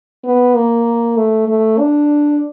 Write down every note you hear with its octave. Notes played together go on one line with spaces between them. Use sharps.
B3
A#3
A3
A3
D4